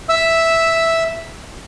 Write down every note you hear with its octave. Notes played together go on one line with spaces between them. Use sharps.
E5 E6